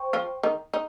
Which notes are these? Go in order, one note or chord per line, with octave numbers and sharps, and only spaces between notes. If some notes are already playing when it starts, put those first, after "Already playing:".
Already playing: C5 G5 C#6
F3 F4
D#3 D#4
D#4